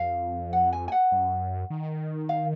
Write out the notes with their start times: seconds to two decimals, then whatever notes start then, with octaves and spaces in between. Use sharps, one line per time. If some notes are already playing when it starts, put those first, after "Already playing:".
Already playing: F2 F5
0.53 F#5
0.73 G#5
0.88 G#5
0.92 F#5
1.12 F#2
1.70 D#3
2.29 F5